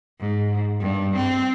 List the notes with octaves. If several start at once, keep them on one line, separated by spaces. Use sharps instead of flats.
G#2
G2
C4